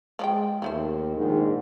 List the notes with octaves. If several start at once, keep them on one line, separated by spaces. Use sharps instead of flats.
F3 G#3 D5 G5
D#2 F3 A3 C5
A#1 G#2 D#3